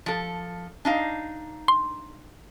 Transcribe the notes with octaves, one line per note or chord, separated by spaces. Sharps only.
F3 A4
D4 D#4 F5
C6